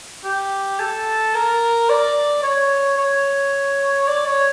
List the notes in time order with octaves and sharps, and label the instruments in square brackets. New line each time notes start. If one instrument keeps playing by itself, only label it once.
[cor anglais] G4
A4
A#4
D5
C#5
C#5
D5
C#5